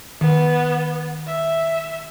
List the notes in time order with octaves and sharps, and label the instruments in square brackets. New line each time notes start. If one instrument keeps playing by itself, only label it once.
[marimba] D#3 [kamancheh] B3
[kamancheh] E5